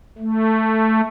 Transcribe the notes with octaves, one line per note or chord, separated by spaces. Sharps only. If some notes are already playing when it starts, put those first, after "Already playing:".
A3